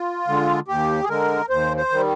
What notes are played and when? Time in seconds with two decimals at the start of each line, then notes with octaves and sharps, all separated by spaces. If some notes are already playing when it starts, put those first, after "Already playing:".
Already playing: F4
0.27 D3 G#3
0.68 D#2 G4
1.04 G#4
1.09 D3 G#3 A#4
1.50 D#2 C5
1.77 C5
1.91 D#3 G3